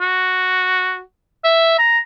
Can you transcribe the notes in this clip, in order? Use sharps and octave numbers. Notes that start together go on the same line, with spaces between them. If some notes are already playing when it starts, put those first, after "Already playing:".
F#4
E5
A#5